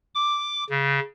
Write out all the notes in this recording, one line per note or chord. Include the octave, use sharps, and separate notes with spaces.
D6
C#3